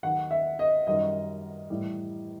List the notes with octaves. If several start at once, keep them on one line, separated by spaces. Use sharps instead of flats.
D#2 D#3 F#3 F#5
E5
D#5
F#2 D#3 G3 D#5
A2 E3 G3